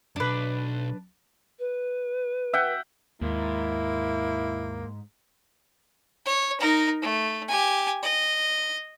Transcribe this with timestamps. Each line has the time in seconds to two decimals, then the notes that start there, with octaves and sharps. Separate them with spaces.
0.16 B1 F#2 D4 B4
1.59 B4
2.53 E5 F#5 G5
3.22 D#2 G#2 A#3 E4
6.26 C#5
6.60 D#4 A#4
7.02 A3
7.48 G4 G#5
8.03 D#5